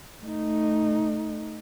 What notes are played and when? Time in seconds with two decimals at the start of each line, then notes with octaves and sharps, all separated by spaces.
0.24 A3 D#4